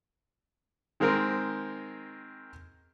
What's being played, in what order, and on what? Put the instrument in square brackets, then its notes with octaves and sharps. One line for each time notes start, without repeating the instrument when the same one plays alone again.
[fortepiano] D#3 G#3 C4 A#4